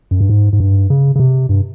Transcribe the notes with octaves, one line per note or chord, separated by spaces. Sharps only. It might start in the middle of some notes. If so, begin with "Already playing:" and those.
F#2
G2
G#2
G#2
G2
C#3
C#3
C3
G2